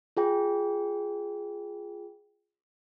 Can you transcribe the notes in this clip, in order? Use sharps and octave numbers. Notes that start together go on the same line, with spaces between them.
F4 G#4 G5